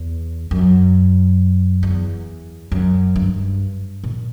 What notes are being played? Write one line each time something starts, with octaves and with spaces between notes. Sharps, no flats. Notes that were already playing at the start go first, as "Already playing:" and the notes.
Already playing: E2
F#2
E2
F#2
G2
A#2